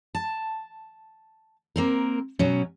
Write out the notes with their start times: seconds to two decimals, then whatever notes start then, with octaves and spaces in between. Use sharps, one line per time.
0.15 A5
1.76 A#3 C4 A#4
2.39 B2 F#3 C#4